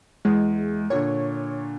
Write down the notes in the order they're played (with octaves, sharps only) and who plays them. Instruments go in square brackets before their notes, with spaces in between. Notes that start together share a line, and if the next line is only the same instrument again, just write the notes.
[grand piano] E2 [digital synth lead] G#3
[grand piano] A#2 D3 [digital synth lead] C#5